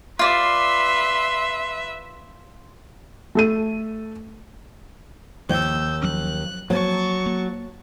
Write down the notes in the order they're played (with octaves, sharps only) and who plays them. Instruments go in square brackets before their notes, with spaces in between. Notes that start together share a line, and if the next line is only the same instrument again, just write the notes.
[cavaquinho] F4 D5 [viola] B4 E5 [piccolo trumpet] C6
[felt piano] A3 A4 D#7
[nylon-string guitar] D#2 [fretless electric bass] F3 A#3 [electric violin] E6 G6
[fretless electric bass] F3 F#3 C#4 [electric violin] F#6
[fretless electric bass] F3 A#3 C4 [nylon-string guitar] F#3 [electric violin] A5 C#6
[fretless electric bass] A#3